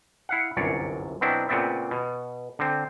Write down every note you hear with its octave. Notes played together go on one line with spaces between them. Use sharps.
E4 F5 F#5
G1 C2 F#2 C#5 D5
B2 F#3 C4 D4 E4
A#2 C#3 B3 C4 D5 E5
B2
D3 C4